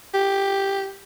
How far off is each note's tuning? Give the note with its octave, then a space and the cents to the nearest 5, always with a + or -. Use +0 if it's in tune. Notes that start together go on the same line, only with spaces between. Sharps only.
G4 +5